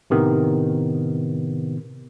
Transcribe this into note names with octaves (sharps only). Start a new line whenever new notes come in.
A2 C3 D#3 B3